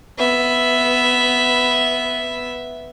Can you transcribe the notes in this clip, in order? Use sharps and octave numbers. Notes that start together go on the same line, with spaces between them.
B3 E5